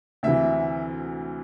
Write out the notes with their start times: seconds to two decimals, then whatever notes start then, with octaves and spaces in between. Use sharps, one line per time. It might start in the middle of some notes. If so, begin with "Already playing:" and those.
0.23 D2 C3 E3 E5